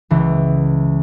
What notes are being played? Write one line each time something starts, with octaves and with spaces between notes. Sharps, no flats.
C#2 E3